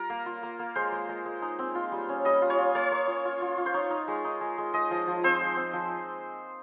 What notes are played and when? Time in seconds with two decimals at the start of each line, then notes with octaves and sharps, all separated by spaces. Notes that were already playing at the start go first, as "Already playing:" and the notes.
Already playing: G3 F4 A#4
0.10 A#3
0.26 F4
0.43 A#3
0.59 A#3
0.75 G#3 C5
0.92 G#3
1.09 G#3
1.25 G#3
1.42 D#4
1.59 C4
1.75 F4
1.92 G3
2.09 C#4
2.25 G3 D#5
2.42 F4
2.50 C#5
2.58 F4
2.75 A#3 C#5
2.91 A#3
3.08 F4
3.25 F4
3.42 F4
3.58 F4
3.66 C5
3.74 D#4 C#5
3.90 D#4
4.08 G#3
4.24 D#4
4.41 G#3
4.58 G#3
4.74 G#3 D#5
4.90 F3
5.07 F3
5.23 C4 C5
5.41 G#3
5.57 C4
5.73 F3